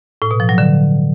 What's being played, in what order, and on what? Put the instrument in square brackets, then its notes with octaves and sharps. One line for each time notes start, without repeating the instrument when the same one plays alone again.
[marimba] A2
B2
F3
F#3
D3